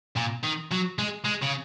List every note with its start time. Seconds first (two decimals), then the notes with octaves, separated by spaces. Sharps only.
0.16 A#2
0.43 D#3
0.71 F#3
0.99 G#3
1.25 G#3
1.42 C#3